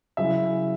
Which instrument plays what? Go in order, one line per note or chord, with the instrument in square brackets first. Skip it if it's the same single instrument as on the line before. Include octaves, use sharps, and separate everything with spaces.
[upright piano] C#3 F#3 C#4 E4 E5